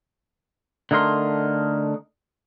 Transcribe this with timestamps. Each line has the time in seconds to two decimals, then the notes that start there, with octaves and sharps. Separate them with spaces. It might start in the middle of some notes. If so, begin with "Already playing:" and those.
0.91 D3 A3 D#4 A#4 C6